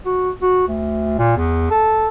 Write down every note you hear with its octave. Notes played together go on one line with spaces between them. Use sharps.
F#4
F#4
D2
A#2
E2
A4